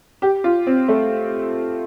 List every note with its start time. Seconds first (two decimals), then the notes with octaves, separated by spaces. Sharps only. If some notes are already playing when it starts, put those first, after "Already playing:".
0.22 G4
0.44 F4
0.67 C4
0.88 A3